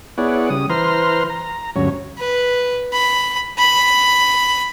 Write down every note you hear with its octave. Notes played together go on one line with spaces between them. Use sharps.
B3 E4 G#4 C#5 D5 F#5
C#3 G3 D#6
E3 B4 C5 A#5 C6 F6
A#5
D2 G2 F#3 C#4 C#5
B4
B5
B5